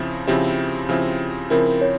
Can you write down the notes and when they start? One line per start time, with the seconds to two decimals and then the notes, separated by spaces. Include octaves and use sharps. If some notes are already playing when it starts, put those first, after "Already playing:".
Already playing: C#3 F3 C4 E4
0.27 C#3 F3 C4 E4 G4
0.89 C#3 F3 C4 E4
1.50 C#3 F3 C4 E4 A#4
1.81 C#5